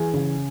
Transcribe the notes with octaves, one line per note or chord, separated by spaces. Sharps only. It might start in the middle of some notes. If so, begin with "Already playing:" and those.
Already playing: E3 G#4 G#5
C#3